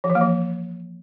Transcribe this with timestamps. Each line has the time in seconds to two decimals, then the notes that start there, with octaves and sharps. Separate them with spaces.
0.04 F3
0.10 E3
0.15 A#3
0.21 F3